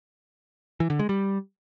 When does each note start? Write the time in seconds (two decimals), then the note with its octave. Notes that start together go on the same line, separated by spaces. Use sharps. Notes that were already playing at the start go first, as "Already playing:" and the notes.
0.80 E3
0.90 D3
0.99 G#3
1.09 G3